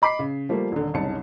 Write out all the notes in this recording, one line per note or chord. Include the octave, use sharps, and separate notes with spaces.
D#5 B5 D6 B6 C7
C#3
F3 G3 A3 A#3
D#1 D3
F#1 C2 C#4 D#4 A5 C#7